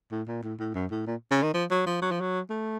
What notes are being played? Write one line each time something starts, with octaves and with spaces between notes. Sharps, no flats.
A2
A#2
A2
A2
F#2
A2
A#2
C#3
D#3
F3
F#3
F3
F#3
F3
F#3
A3